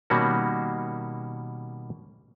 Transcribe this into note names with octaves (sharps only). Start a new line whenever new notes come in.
B2 D#3 G3 A#3 C#4 F#4